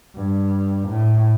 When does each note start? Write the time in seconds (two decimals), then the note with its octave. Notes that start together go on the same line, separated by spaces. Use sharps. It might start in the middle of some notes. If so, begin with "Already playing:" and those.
0.15 G2
0.88 A2